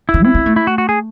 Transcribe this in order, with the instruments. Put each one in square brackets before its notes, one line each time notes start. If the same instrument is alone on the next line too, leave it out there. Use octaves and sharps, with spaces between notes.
[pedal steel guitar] E4
[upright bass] C#3
[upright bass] C4 [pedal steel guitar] E4
[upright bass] C4
A3
[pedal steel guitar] E4
F#4
F#4
G#4